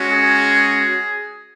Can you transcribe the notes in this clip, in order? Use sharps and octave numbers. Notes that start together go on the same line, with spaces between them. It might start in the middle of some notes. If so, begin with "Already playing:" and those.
Already playing: G#3 C#4 F#4
G#4